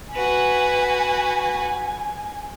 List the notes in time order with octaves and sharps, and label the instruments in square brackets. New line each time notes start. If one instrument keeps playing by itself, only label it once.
[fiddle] F#4 B4 [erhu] G#5